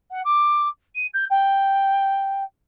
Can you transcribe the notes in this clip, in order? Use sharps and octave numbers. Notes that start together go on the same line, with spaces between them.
F#5
D6
D#7
G6
G5